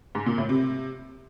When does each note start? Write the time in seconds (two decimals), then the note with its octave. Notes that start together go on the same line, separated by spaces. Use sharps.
0.15 G#2
0.26 A#2
0.38 A2
0.49 C3